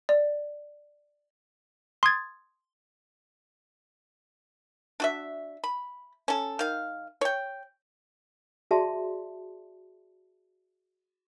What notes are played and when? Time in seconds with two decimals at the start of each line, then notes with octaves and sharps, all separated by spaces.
0.09 D5
2.03 C6 D#6 G#6 A6
5.00 D4 F#4 E5
5.64 B5
6.28 C#4 A4
6.59 D#3 F5
7.21 C#5 G5
8.71 F#4 G#4 D5 E5 A5 C6